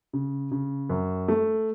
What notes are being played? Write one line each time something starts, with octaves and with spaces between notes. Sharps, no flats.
C#3
C#3
F#2
A3